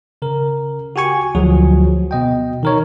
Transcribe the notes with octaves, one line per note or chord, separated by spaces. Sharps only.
C#3 A#4
F#4 G4 G#5 C#6
D2 F3 F#3 F#4 G#4
B2 D#5 G5
D#3 A#4 C#5